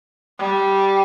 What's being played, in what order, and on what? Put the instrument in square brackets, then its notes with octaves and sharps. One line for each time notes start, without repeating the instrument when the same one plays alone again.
[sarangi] G3